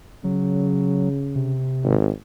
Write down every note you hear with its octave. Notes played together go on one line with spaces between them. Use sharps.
C#3 F#3
C3
G#1